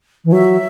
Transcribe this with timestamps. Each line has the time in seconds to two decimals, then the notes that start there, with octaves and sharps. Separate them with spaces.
0.25 E3
0.32 F#3 E5